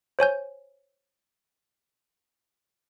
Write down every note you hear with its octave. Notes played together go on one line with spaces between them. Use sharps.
C5 C#5 G#5 G6